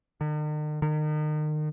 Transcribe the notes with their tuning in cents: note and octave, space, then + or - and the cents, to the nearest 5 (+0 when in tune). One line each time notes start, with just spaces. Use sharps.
D#3 -45
D#3 -35